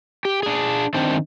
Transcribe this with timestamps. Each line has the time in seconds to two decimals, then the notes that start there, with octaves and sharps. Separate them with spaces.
0.25 G4
0.43 D4 G#4
0.94 D#3 C4 D4 C5